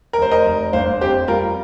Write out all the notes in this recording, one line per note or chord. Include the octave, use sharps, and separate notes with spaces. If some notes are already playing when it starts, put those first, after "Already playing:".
A#4
F1 C5
A#4 D#5
F1
G1 C5 F5
F2 G4 C5
G3 F4 A#4